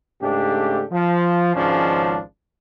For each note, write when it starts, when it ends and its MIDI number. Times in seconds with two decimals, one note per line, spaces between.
0.21 0.83 44
0.21 0.83 49
0.21 0.83 57
0.21 0.83 62
0.21 0.83 67
0.92 1.51 53
1.55 2.19 32
1.55 2.19 37
1.55 2.19 44
1.55 2.19 53
1.55 2.19 61
1.55 2.19 62